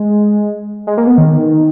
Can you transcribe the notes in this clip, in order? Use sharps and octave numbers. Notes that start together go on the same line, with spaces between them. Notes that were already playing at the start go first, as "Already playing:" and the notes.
Already playing: G#3
G#3
A#3
B3
D#3